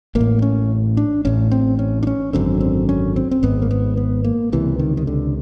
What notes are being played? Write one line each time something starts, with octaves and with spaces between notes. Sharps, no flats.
A1 A#3
A2
C#4
D4
A1 A2 C#4
C4
C#4
D4
C#4
G#1 F#2 D3 C4
C4
C#4
C4
C4
G#1 G#2 B3
A#3
B3
B3
A#3
C#2 C3 E3
D#3
D#3
D3